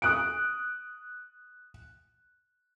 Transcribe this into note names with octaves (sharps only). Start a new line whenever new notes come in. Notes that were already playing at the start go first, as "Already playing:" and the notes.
D#6 F#6 D7